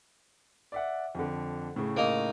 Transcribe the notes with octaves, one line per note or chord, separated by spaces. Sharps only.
D5 E5 F#5
F2 D3
A2 C#3
A#3 D#4